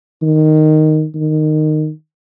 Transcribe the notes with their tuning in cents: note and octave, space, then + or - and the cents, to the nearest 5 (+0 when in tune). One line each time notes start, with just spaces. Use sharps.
D#3 -5
D#3 -15